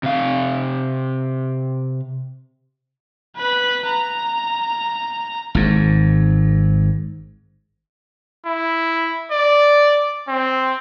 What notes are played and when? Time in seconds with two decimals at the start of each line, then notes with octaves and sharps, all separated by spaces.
0.03 C3 F5
3.37 B4 B5
3.87 A#5
5.55 G#1 G#2
8.46 E4
9.32 D5
10.29 C4